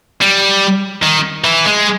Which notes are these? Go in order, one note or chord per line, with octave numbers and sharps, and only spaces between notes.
G3
D#3
E3
G#3